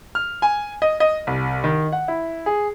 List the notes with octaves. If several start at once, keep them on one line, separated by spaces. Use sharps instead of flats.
F6
G#5
D#5
D#5
C2
D#3
F#5
E4
G#4